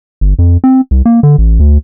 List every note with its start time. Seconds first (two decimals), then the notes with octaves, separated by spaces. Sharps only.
0.21 G1
0.39 F2
0.64 C4
0.91 C2
1.05 A#3
1.23 D3
1.38 A1
1.60 D2